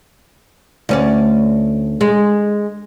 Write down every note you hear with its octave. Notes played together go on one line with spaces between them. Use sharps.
D2 C#4 D5
G#3